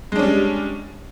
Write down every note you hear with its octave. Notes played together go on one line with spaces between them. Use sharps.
G3 G#3 C#4 D4